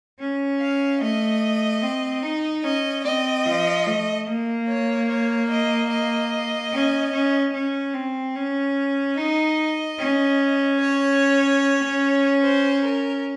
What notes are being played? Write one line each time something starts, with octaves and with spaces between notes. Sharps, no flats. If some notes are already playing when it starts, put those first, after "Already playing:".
C#4
F5
A3 D#5
C4
D#4
C#4 D#5
C4 D#5
F3
A3
A#3
C#5
C#5
D#5
D#5
C#4
C#4
C#4
C4
C#4
D#4 D#5
C#4
C#5
C5
A#4